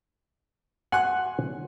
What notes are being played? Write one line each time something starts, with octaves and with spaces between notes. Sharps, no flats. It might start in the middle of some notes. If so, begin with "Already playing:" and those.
F#5 G#5 C6 F#6